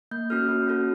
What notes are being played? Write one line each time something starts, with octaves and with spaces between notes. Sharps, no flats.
A#3 G6
C#4 F#4 A4 F6
A#3
C#4 F#4 A4